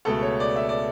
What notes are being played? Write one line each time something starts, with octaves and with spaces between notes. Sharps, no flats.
C#2 B2 A3 A4
C#5
D5
E5
D5